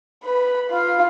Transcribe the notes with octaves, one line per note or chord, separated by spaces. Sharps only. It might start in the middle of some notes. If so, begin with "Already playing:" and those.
B4 B5
F4 F5